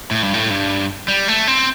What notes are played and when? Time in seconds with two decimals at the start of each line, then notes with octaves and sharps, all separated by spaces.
0.11 A2
0.23 G2
0.34 A2
0.50 G2
1.08 G3
1.28 A3
1.47 C4